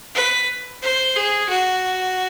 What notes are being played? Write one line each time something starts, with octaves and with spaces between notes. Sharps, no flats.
B4
C5
G#4
F#4